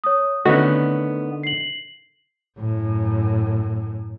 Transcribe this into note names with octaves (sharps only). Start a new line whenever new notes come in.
C#5 D#6
D3 D#3 A3 B3 C#4 F#4 D#5
C7 F#7
F#2 A2